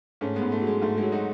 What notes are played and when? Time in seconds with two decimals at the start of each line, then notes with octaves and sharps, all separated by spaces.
0.21 G#2 A3 C#4
0.36 G#3 B3
0.42 G#2
0.52 A3
0.62 F#3 G#3
0.82 G#2 A3
0.97 G#3
1.02 F#3
1.12 D#4 F#4